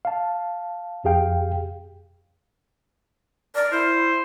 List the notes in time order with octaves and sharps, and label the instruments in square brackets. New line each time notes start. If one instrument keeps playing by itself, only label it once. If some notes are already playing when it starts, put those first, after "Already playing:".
[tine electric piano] F5 A5
F2 G4 G#4 F5 G5
[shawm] A#4 [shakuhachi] D5
[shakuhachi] E4 [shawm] C5